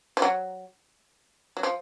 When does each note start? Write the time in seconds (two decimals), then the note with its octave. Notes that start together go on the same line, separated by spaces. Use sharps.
0.17 F3
0.22 F#3
1.57 F#3
1.63 F3